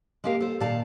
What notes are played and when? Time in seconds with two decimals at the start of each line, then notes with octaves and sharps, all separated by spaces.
0.24 G#3 A#3 G4 A#4 F5
0.40 A4 C5
0.60 A#2 D#3 D5 F5 A5